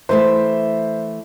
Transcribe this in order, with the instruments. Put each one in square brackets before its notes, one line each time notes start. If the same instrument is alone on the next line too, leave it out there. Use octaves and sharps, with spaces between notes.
[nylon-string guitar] E3 A3 E5 [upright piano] C5